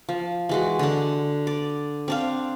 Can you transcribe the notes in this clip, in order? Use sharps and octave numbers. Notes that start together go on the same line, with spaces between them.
F3
E3 G#3 F#4
D3 D4
D5
C4 D4 F5